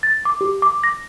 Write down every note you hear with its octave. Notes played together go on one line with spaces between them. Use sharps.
A6
D6
G4
D6
A#6